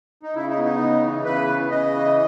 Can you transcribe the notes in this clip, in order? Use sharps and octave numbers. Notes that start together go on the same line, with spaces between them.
D#4
C#3 E4
D#4
B3
D#4
C#3
E3
C#3 B4
B3
C#3 D#5
E3